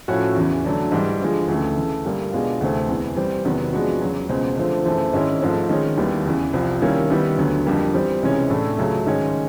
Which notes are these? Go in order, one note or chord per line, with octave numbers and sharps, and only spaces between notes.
A2 F3 A3 C#4 F#4
E2 C#3 E3
D3 F#3 A3 D4
G#2 E3 G3
D3 F3 G#3
D2 C#3 E3 A3
C#3 E3 A3
G2 D3 G3 A#3
B2 G#3 B3 D4 F4
D2 C3 E3 A3 C4
E2 C3 E3
E3 G3 C4
E2 C3 D#3 F#3 B3
F3 G#3 B3 D4 F#4
E2 C#3 F#3
C#2 B2 G#3 C4
D3 F3 A3 C4
F#2 C#3 E3 A3 C4
G#2 D#3 G#3 C#4 E4
G#2 F3 A3 C4
D#3 G#3 C#4
D#2 D#3 G3 B3 E4
E2 C#3 E3
C2 C3 F3
D#3 G3 A#3 C#4 E4
D#3 G3 B3 E4
D2 D3 F#3 B3
F2 D3 G3 A#3
E3 G3 C4
C#2 C3 E3 G#3 C#4
A2 E3 A3 D4
C#2 C#3 F#3 A3
G#2 D#3 G#3 C#4